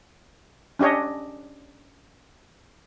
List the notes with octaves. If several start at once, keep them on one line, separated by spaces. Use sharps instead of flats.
C#4 D4 G4 C#5 D#5